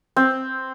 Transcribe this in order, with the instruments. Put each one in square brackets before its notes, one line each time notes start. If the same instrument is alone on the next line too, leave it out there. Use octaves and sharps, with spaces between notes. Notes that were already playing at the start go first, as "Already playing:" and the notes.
[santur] C4